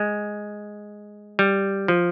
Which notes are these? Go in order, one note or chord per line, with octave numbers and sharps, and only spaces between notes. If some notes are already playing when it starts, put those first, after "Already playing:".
Already playing: G#3
G3
F3